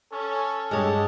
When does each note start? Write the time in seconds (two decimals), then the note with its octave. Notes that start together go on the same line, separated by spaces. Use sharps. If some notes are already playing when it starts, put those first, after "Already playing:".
0.12 C#4 A4
0.71 G2 G#3 G4 C#5 A5 D#6